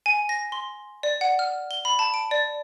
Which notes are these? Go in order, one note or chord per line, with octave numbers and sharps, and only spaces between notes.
G#5
A#6
C6
D5
F#5
F6
G7
B5
A5
D7
D5